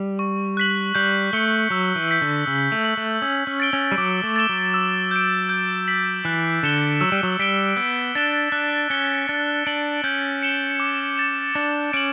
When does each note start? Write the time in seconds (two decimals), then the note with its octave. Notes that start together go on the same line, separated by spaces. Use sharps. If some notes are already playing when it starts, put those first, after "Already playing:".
Already playing: G3
0.19 C#6
0.57 F#6 B6 F#7
0.95 G3 G6
1.33 A3 C#7 G7
1.70 F#3 E6
1.96 E3
2.08 G6 B6 F#7
2.22 D3
2.46 C#3 E6
2.72 A3
2.84 B6 F#7
2.97 A3
3.22 C#4 E6
3.47 C#4
3.60 A6 D7 G7
3.73 C#4
3.92 G3
3.98 F#3 D6
4.23 A3
4.36 A6 E7 G7
4.49 F#3
4.74 E6
5.11 G6 D7
5.49 G6
5.87 B6 F#7
6.25 E3 F#6
6.63 D3 C#7 E7 G7
7.01 F#3 E6
7.12 G3
7.23 F#3
7.39 G3 B6 D7 G7
7.76 B3 E6
8.15 D4 A6 E7 G7
8.52 D4 F#6
8.90 C#4 C#7 G7
9.28 D4 A6
9.66 D4 D7 F#7
10.04 C#4 G6
10.42 C#7 E7 G7
10.80 D6
11.18 A6 E7
11.55 D4 A6
11.93 C#4 D7 F#7